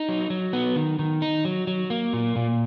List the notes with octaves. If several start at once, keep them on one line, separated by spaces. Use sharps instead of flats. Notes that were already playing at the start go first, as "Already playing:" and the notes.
Already playing: D#4
F#3
F#3
B3
D#3
D#3
D#4
F#3
F#3
A#3
A#2
A#2